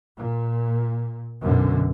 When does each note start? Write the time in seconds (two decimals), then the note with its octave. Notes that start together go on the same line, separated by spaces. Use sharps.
0.17 A#2
1.42 B1 F#2 D3